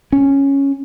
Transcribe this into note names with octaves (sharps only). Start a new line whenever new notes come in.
C#4